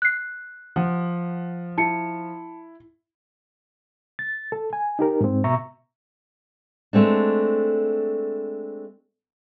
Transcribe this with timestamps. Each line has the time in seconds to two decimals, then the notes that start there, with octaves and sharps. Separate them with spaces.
0.02 F#6 C7
0.76 F3 F#5
1.78 E4 A5 C#7
4.19 A6
4.52 A4
4.73 G#5
4.99 D#4 G4 A#4
5.21 G#2 C4
5.44 B2 E5 A#5 C#6
6.93 G#3 A3 C4 D4